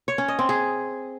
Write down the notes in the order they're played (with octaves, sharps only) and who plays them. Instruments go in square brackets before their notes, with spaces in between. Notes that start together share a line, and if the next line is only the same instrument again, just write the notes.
[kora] C#5
C#4
D#5
C4
G#4